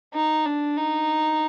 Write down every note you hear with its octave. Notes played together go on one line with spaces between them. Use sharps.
D#4
D4
D#4